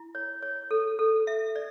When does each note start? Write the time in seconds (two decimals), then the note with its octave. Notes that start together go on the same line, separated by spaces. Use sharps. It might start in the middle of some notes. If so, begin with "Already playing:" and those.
Already playing: E4
0.15 C#5
0.42 C#5
0.71 A4
0.99 A4
1.27 E5
1.56 D5